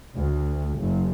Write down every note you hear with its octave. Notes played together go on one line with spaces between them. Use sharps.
D2
F#1